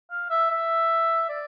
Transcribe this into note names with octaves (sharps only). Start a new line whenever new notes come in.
F5
E5
E5
D5